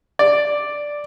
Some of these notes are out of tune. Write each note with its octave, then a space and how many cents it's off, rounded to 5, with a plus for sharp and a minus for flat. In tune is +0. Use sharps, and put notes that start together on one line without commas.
D5 +0